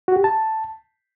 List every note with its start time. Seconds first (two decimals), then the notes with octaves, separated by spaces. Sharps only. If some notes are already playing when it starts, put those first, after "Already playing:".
0.08 F#4
0.16 G4
0.24 A5